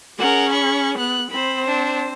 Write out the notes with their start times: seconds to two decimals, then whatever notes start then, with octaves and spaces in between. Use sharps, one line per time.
0.19 C#4 G#4 A#4 F#5
0.51 B5 C#6
0.98 B3 F#6
1.31 C4 C5 B5
1.65 D4